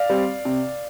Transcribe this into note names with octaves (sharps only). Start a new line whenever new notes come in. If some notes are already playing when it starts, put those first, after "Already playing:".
Already playing: D5 F5
G3 C4
C3